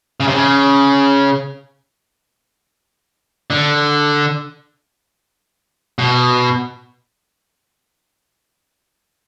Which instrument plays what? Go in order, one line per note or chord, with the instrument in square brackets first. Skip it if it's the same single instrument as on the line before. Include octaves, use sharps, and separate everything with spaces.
[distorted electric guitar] C#3
C3
C#3
D3
B2